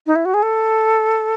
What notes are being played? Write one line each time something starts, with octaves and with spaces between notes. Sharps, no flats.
D#4
E4
F#4
G#4
A4